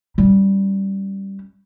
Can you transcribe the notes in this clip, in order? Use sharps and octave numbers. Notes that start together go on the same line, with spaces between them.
G3 C#4